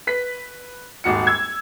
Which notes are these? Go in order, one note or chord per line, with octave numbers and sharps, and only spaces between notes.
B4 B6
D#1 G#1 F#4 C#7
E6 G#6